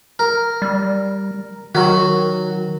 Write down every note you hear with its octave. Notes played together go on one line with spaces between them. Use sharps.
A#4
G3
D#3 F#3 F#4